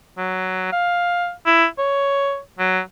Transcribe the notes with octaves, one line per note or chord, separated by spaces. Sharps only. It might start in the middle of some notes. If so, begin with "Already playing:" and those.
F#3
F5
E4
C#5
F#3